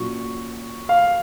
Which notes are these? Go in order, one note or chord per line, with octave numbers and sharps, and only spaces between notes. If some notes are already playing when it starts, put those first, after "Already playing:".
Already playing: A#2 F#3 C#4 C#6
F5